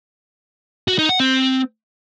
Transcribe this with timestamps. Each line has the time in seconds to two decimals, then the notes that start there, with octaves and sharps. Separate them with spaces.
0.88 F#4
0.98 D#4
1.09 F#5
1.20 C4